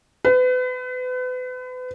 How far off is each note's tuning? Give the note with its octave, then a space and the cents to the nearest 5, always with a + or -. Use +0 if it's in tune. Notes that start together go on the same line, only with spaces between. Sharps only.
B4 +35